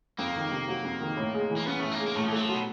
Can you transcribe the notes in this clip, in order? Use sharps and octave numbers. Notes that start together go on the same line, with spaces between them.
F2 A#3
D#3
C3
F#3
F2
D#3
A2
G#3
E3
A#3
B3 C#4
A2 A3
A#3
G#3
A#3
A2 A3
F3
E3
F#3 A3
F3
B2 F#3